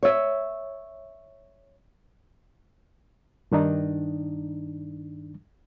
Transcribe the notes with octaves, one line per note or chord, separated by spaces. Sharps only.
C#5 E5
G2 D#3 D4 D#4